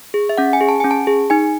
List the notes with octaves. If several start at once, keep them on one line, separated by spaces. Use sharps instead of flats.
G#4
E5
C#4 F#5
G#5
G#4
A5
C#4 G#5
A5
G#4
D#4 G#5